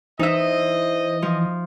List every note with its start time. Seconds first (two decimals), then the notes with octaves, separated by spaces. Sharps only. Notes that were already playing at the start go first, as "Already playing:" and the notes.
0.19 E3 D#4 C5 D#5 E5
1.22 F3